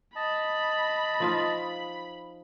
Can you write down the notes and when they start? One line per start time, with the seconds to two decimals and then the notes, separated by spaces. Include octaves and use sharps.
0.16 D#5 A5 B5
1.20 F3 D#4 F4